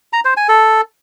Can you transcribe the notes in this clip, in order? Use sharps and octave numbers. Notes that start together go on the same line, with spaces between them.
A#5
C5
G#5
A4